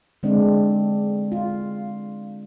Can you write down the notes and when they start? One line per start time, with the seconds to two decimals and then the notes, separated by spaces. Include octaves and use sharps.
0.23 D3 G#3 C4 D4
1.32 F4